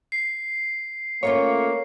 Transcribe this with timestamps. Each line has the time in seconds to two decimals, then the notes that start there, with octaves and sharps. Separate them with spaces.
0.12 C7
1.23 A3 A#3 C#4 F4 C#5